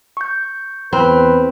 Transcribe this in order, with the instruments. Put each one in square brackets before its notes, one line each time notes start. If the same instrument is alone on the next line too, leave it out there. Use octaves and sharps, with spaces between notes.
[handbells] C#6 G6
[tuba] E2 [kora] C4 [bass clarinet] B4